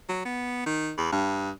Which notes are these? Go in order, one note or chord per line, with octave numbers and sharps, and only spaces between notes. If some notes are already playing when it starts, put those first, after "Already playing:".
F#3
B3
D#3
E2
G2